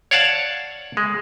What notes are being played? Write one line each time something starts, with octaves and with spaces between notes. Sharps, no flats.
C#5 D5 F5 F#5 A5
G#3